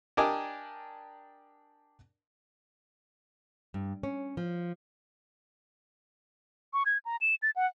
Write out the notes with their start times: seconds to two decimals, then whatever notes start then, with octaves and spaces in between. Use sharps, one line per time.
0.17 D4 G4 A#4 D5 D#5 G#5
3.74 G2
4.03 C#4
4.37 F3
6.73 C#6
6.86 G#6
7.05 A#5
7.21 E7
7.42 A6
7.56 F#5